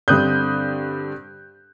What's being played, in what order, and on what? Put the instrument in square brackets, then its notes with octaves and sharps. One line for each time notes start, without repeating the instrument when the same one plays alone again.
[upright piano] G2 D3 C4 D#6 F#6 G6